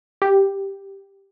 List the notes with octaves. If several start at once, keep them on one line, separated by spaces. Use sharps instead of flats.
G4